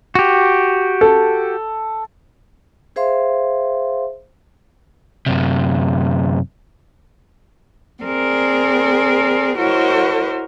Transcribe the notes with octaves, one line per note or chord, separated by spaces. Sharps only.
F#4 G4
A4
G#4 C5 E5 F5 C6
F#2 C3
C4 G#4 A#4 D5
E4 F#4 A#4 C5 C#5 D#5